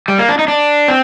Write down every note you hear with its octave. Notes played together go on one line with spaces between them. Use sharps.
G3
A#3
D4
D#4
D4
C4